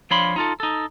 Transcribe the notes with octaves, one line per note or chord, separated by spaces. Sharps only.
F3 D4 C#5 F5 B5 C6
D#4 F4 A4
D#4 A4